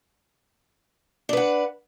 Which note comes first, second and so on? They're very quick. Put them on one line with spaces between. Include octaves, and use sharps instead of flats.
D4 B4 F#5